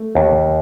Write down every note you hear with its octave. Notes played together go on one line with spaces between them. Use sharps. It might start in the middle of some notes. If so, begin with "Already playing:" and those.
Already playing: A3
D#2